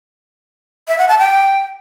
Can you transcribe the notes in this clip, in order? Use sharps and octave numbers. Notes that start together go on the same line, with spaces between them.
E5
F#5
A5
G5